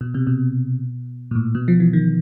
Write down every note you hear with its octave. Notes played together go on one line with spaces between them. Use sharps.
B2
C3
B2
A#2
A2
B2
F3
E3
D#3